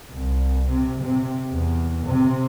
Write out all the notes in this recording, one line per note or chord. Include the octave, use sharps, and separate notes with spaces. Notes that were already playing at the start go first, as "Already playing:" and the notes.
C2
C3
C3
E2
C3